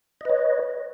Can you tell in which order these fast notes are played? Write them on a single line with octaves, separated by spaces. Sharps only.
D#5 B4 C#5